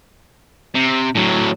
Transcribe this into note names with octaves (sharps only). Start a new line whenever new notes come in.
C3
A2 F#3